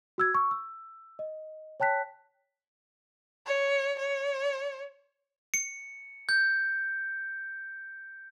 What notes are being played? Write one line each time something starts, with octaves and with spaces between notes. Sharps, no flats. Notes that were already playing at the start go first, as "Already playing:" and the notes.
F#4 E6 G#6
C#6 E6
E6
D#5
C#5 G5 A5 F#6 B6
C#5
C#5
C#7
G6